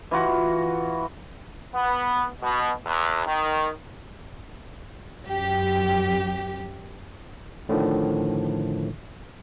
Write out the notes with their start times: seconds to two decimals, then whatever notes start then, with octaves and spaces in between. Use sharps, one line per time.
0.11 E3 F4 F#4
1.74 B3
2.42 B2
2.86 E2
3.26 D#3
5.26 F#2 G4
7.69 A2 D3 D#3 F3